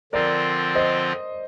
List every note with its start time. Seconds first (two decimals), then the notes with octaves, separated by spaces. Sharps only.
0.13 D3 F3 C4 F4 A#4 D5
0.75 C5 D#5